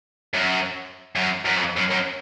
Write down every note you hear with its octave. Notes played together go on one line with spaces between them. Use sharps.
F#2
F#2
F#2
F2
F#2
F#2